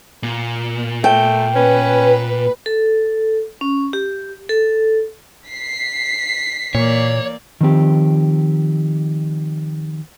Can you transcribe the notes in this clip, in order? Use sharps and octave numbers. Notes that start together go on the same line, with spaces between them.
A#2
A3 G5
C#4 B4
A4
C#4
G4
A4
B6 C7
A#2 E3 A#3 C#5 D5
D#3 F3 C4 G4